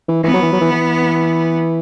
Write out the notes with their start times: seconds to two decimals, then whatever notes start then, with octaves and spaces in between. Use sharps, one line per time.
0.09 E3
0.24 E3 B3
0.34 F#3
0.42 E3
0.52 F#3
0.61 E3
0.72 E3